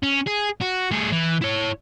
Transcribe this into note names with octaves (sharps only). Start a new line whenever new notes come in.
C#4
G#4
F#4
A3 G#4
E3
E4 C#5